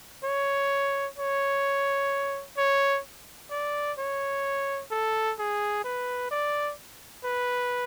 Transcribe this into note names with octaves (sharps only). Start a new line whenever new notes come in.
C#5
C#5
C#5
D5
C#5
A4
G#4
B4
D5
B4